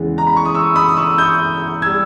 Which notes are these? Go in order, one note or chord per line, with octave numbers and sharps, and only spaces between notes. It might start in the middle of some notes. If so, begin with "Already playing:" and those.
Already playing: E2 C#3 E3 G#3
A#5
B5
C#6
D#6
C#6 E6
B5 D#6
D#6
C#6 E6
D#6 G6
G3 E6 G#6